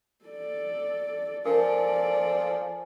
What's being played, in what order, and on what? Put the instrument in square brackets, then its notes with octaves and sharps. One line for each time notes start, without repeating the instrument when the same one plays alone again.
[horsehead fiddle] A4 D5
[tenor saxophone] F3 [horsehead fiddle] A4 D5 [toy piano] A#4 [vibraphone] G#5 A5